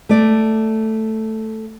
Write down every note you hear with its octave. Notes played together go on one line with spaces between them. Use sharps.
A3 D5